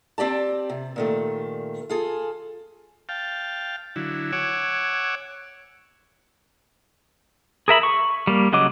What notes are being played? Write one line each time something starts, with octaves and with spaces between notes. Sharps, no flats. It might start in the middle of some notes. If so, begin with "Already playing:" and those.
C4 G4 D5 A5
C3
A#2 D#3 A3
F4 G#4 A4
F5 G5 A5
D3 F#3 E4
C#5 F#5 G#5 D6 E6
G#4 A#4 E5 B5
C#6
G3 A#3
C#3 F#3 D#5 D6